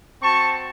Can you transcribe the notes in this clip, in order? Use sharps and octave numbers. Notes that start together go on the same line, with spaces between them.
C4 F#4 A5 C#6